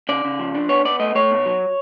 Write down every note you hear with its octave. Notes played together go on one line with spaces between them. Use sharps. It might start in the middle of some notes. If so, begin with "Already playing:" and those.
C#3 D5
C#3
F3
D4
B3 C#5
B3 D5
A3 D#5
A3 C#5
B2
F#3